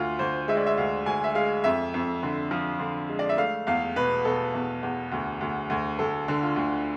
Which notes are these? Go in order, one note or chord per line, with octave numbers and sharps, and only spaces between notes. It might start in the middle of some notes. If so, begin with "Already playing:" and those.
Already playing: D2 F4
D2 C5
G#3 E5
D5
E5
D2 F5
D2 G#5
E5
G#3 F5
F2 E5
F2
D3
F3
D3
G#3
D5
E5
A3 F5
E2 F5
B2 B4
B2 A4
E2
E2
D2
D2
D2
D2 A4
D3
F4
D2